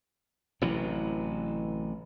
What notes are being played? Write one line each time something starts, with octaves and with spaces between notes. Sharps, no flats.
A1 C3 E3 F#3